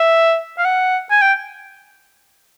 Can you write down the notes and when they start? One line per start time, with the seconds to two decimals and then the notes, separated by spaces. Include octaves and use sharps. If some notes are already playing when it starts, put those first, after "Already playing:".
Already playing: E5
0.58 F5
0.65 F#5
1.11 G#5
1.22 G5